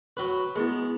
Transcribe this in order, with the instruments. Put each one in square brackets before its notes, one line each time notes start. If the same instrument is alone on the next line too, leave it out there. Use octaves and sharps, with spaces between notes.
[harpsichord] F#3 B4
[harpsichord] G#3 [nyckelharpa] B3 [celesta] E4 G#4